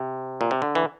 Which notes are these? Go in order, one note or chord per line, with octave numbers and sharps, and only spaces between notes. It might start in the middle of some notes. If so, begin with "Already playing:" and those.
Already playing: C3
A#2
C3
D3
E3